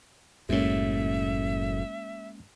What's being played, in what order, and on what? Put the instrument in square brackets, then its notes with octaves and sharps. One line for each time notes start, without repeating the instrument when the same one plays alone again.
[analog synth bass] F#1 [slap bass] F#2 A2 [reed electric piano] G#3 A#3 C#4 [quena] E5